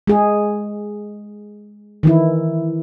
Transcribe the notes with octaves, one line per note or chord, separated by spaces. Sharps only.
G#3 G#4
D#3 E3 E4